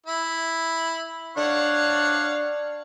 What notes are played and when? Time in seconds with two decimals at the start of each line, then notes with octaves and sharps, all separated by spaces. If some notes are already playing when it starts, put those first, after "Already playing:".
0.07 E4
1.37 D4 C#5 F5 F#5